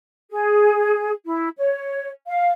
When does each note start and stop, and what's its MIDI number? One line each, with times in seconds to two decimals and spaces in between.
0.31 1.11 68
1.26 1.49 64
1.58 2.09 73
2.28 2.52 77